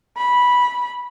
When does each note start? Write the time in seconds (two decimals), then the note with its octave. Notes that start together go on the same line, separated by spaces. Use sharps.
0.17 B5